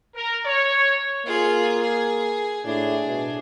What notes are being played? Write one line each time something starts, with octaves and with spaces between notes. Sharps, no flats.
A#4
C#5
A#3 F4 G#4
G#4
A2 D4 G#4
B2